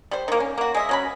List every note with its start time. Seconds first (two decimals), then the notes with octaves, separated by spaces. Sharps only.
0.11 G3 C5
0.28 D#3 A#3
0.40 C#4
0.58 A#3 F#4
0.74 G#3 D#5 E5
0.89 F#3 C#4 B5